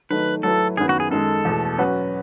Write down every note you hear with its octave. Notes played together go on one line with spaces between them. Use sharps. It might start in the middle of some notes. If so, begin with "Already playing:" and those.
D#3 F#3 A3 D#4 B4
F#3 A3 E4 A4 B4
F#2 D#3 F#3 B3 G#4
F#4
G#4
F#2 D#3 G#3 A4
E2 B2 A3
F#3 C#4 F#4 B4